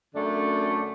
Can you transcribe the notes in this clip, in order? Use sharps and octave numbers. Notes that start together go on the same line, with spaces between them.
F#2 D3 A3 D4